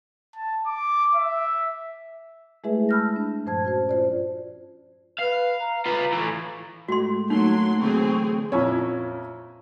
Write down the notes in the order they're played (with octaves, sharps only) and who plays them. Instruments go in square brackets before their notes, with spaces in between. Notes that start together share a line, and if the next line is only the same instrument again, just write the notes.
[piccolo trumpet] A5
D6
E5
[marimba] G#3 A3 E4 G#4 B4 E5
A5 B5 E6 F6 G6 A#6
D4
G2 A#2 F3 C5 A5 G#6
C#4 F#4 C5
F4 C5 D5
[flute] B4 [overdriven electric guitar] F5
[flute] A#5
[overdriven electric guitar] F4 B4
A2 E3
[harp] A2 [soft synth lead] G#3 [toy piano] F#4 C6
[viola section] F#3 C6 [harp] A3 C#4 [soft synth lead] A#3 [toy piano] D#4
[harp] D3 E3 F#3 [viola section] C4 G#4 [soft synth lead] C#6
[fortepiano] F2 A#2 C#4 E4 C#5